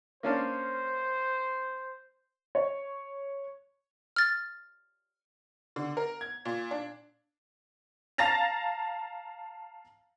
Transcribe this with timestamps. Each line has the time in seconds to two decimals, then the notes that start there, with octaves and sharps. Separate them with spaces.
0.23 A#3 C#4 D4 C5
2.55 C#5
4.16 F6 A6
5.76 D3
5.97 A#4
6.21 G#6
6.45 A#2
6.71 D4
8.18 F5 A5 A#5 A6 A#6 F7